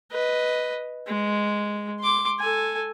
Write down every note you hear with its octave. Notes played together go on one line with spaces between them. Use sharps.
B4 D#5
G#3
C6 D6
A4 G#5